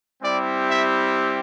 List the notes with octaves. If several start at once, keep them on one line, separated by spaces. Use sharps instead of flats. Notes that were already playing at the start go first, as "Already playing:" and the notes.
G3 C4 E4 G4 D5
E5